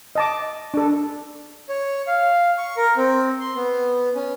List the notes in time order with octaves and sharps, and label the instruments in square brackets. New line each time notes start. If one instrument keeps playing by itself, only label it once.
[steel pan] D#5 A5 D6
D4 A4
[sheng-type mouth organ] C#5
F5
C#6
A#4
C4
C6
B3
C#4